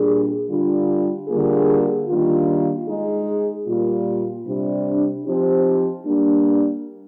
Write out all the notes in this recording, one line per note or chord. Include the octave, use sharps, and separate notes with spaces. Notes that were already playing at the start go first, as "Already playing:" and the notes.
Already playing: A#2 G3 D4 G#4
D3 G3 D4 F4
D3 G3 A#3 F4 G#4
D#3 G3 A#3 D4 F4
G#3 D#4 G#4
A#2 G3 A#3 F4
C3 G3 D4
F3 C4 D#4 G4
G3 A#3 D4